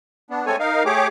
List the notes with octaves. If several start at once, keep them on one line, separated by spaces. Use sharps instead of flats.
B3 D4
G#3 A3 C4 A4 C#5 G#5
D#4 A#4 F5
A3 G4 G#4 C#5 D6